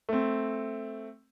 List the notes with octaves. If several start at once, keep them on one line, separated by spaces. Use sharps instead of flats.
A3 C4